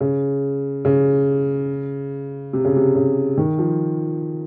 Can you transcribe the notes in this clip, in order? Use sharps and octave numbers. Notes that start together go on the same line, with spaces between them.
C#3
C#3
C3
C#3
C3
C#3
D#3
F3